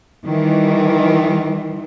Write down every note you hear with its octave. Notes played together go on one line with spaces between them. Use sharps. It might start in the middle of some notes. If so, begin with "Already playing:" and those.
D#3 E3 G3